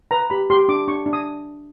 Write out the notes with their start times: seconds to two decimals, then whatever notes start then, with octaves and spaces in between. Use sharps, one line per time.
0.11 B4 A#5
0.30 G4 B5
0.50 G4 C6
0.69 D4 D6
0.88 D4 C#6
1.06 D4
1.13 D#6